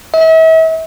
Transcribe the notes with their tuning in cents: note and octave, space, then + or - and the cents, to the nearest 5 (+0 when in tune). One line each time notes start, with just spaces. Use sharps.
E5 -40